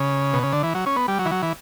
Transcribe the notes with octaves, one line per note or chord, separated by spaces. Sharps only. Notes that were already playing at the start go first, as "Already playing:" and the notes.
Already playing: C#3
B2
C#3
D3
E3
F#3
C#4
B3
G3
F#3
E3
F#3
E3